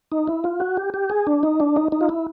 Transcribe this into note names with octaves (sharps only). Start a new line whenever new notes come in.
D#4
E4
F4
F#4
G4
G4
G#4
D4
D#4
D4
D#4
D#4
F4
E4